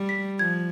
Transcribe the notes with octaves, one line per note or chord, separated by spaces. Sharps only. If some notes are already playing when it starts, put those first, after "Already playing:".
Already playing: G3
B6
F3 G#6